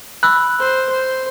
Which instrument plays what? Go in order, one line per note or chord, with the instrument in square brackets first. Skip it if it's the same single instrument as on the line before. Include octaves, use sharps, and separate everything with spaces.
[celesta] B5 E6 [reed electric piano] F#6
[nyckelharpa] C5
C5